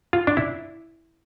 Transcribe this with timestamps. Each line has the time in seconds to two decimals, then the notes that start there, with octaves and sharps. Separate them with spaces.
0.13 F4
0.27 D4
0.37 E4